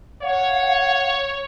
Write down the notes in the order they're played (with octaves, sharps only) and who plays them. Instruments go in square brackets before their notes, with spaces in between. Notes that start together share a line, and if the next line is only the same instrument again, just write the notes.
[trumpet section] C#5 [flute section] F5 F#5